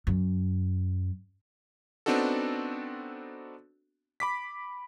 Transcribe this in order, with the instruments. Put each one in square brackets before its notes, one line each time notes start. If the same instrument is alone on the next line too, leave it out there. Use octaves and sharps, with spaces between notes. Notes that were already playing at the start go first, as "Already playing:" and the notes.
[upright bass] F#2
[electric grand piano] B3 C4 D4 D#4 F#4 A4
B5 D6 B6